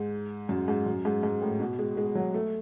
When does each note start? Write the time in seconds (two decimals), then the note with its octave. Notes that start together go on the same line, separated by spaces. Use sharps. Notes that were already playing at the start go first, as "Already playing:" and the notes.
Already playing: G#2
0.49 F#2
0.68 G#2
0.86 F#2
1.05 G#2
1.23 G#2
1.41 A2
1.60 B2
1.79 G#3
1.97 G#3
2.15 F#3
2.34 A3